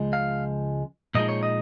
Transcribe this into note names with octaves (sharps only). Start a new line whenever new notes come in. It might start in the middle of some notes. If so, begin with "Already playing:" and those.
Already playing: C#2 F3 G#3
F5
A#2 F3 G#3 D#4 D#5
C#5
D#5